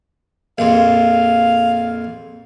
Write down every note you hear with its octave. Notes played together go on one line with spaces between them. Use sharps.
A#1 F2 F5